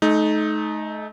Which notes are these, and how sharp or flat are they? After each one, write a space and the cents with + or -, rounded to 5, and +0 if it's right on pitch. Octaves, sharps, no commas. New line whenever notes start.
A3 -35 D#4 +0